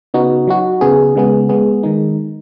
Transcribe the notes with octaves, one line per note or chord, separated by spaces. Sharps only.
C#3 B3 D#4 F#4
F#3 D#4 F#4
C#3 B3 G#4
C#3 G#3 B3 G#4
G#3 B3 G#4
D#3 G#3 D#4